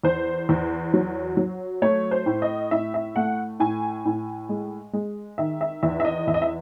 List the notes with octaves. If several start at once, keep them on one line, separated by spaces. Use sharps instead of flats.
E2 C5
E2
F#3
F#3
A3 C#5
C5
A2
D#5
A2 E5
E5
A3 F#5
A2 G#5
A2
G#3
G#3
D#3 E5
E5
E2 E5
E5
D#5
E2 E5
D#5
E5